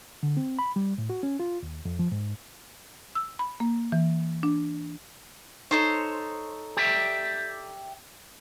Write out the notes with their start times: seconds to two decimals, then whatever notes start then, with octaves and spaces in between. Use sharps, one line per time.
0.23 D3
0.37 C4
0.59 B5
0.76 G3
0.98 A2
1.10 F#4
1.23 C#4
1.40 F4
1.63 D#2
1.85 F2
1.99 F3
2.12 G#2
3.15 E6
3.39 B5
3.60 A#3
3.92 E3
4.43 D4
5.71 D#4 A4 C5 C#5
6.77 G4 D5 E5